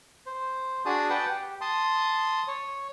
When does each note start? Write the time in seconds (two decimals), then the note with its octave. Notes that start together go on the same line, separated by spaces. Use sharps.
0.26 C5
0.85 D4 F#4 G#4 A5 D#6
1.10 B4 F#5 G5 A5
1.29 G4
1.61 A5 C6 D#6
2.48 C#5